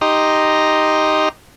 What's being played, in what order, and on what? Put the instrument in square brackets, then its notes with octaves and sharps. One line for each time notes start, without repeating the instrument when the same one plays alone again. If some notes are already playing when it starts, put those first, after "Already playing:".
[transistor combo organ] D#4 G4 D#5 A#5 C6